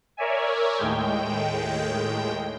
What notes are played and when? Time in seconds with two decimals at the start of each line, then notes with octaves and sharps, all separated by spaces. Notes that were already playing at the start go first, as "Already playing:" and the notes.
0.17 A#4 C#5 D5 E5 G#5
0.77 D#2 A2 G#3 G5